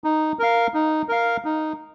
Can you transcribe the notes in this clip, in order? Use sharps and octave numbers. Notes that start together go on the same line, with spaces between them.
D#4
A#4 F5
D#4
A#4 F5
D#4